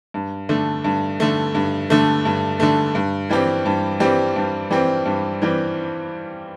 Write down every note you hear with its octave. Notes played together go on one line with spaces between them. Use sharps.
G2
D3 A3
G2
D3 A3
G2
D3 A3
G2
D3 A3
G2
E3 G3 C4 G4
G2
E3 G3 C4 G4
G2
E3 G3 C4 G4
G2
E3 G3 C4 G4